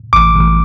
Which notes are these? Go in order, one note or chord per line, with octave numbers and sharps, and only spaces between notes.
A1 D6
A1